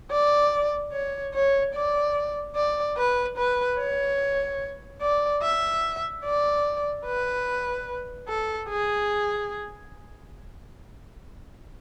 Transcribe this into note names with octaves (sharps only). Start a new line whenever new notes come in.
D5
C#5
C#5
D5
D5
B4
B4
C#5
D5
E5
D5
B4
A4
G#4